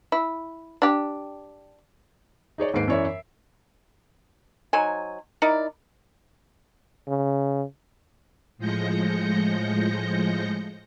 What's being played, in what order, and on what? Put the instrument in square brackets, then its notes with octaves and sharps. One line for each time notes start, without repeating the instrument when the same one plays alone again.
[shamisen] E4
D4 G4
[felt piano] D#4 G#4 C#5 D5
D#2 G#2 B4 C7 D7
F#2 E3 C#5 D5 E5
E5
[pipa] F#3 D#4 C5 G#5
D#4 E4 A#4 D5
[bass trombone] C#3
[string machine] A2 F3 G#3 G6 A#6 C#7